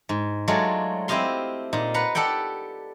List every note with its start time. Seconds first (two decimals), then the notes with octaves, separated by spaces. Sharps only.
0.09 G#2
0.48 F#3 G#3 A3 F4 D5
1.08 C4 E4 G4 D#5 F5 C6
1.73 A#2 D#4
1.94 B4 F#5 A#5
2.15 G4 A4 D5 F#5 G5